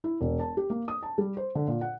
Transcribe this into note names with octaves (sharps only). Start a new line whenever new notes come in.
E4
E1
A5
G4
A#3
D#6
A5
G3
C5
D3
A#2
F#5